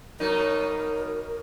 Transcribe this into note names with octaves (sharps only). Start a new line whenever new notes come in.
B2 F#3 D#4 A#4